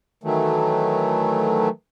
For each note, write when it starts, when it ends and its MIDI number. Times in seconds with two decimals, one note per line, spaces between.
0.24 1.69 51
0.24 1.69 52
0.24 1.69 54
0.24 1.69 57